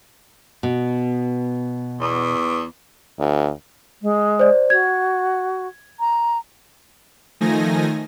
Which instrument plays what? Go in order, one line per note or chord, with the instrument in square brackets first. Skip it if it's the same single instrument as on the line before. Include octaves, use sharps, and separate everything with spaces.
[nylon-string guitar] B2
[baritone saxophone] E2
[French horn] D2
[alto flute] G#3
[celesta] C5 D5
[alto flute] F#4 [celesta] G#6
[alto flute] A#5
[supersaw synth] D#3 F3 A3 D#4 G#5 A#6